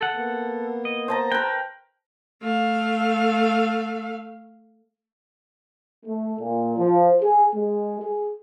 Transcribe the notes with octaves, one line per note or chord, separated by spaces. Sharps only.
A4 F#5
A#3 B3
D#5
C5 A5 A#5
A#4 B4 G5
A3 F5
A3
A#2
F3
G#4
G#3
G#4